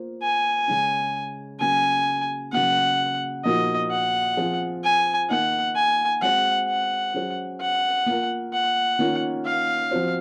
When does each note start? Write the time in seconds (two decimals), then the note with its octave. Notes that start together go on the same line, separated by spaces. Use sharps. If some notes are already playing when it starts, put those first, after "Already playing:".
Already playing: A#3 F4 C5
0.22 G#5
0.68 C#3 G#3 C#4
1.60 C#3 F#3 A#3 G#5
2.52 C#3 F#3 A#3 F#5
3.44 A#2 F3 A#3 D#4 F#4 D#5
3.91 F#5
4.37 F3 C4 F4 G#4 C5
4.84 G#5
5.29 D#3 A#3 D#4 F#5
5.76 G#5
6.22 G#3 C4 F#4 C5 F#5
6.68 F#5
7.14 F#3 C#4 G#4 C5
7.61 F#5
8.06 A#3 F4 A#4
8.53 F#5
8.99 D#3 A#3 C#4 F4
9.45 F5
9.91 F3 C4 F#4 C5